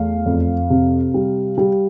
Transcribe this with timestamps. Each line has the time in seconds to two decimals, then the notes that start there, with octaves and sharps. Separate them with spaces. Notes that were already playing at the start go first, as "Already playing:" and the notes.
Already playing: E2 A3 F5
0.26 F2
0.70 C3
1.14 G3
1.58 G3